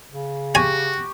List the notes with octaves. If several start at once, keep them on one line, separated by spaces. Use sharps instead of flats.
C#3
F#4 G4 G#5 C#6